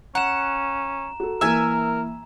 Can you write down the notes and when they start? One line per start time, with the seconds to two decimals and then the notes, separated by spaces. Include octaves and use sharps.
0.15 C#4 F#5 A#5 E7
1.20 F#4 A4
1.41 E3 A#3 A#4 E5 G#5